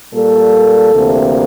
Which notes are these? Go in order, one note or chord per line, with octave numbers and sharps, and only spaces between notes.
A#2 G3 A#3 A4
D2 C3 E3 A#3